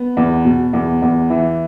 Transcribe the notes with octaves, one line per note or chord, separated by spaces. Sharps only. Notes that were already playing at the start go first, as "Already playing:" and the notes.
Already playing: B3
E2
B2
E2
E2
E3